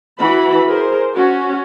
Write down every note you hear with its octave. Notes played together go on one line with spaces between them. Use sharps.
E3 F#4 B5
G#4 A#4 C5
C#4 F#4